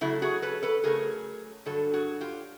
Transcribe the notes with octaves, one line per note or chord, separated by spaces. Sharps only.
C#3 F#3 A3 E4
F#4 G#4
A4 B4
A4 B4
C#3 F#3 A3 G#4 A#4
G2 D3 F#3 A4
F#4 G#4
F4 G4